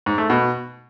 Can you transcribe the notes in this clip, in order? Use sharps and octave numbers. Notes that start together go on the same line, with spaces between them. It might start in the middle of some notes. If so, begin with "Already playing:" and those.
G#2
A3
B2